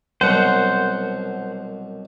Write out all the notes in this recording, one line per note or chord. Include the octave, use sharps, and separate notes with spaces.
C2 F#2 B2 C5 F#5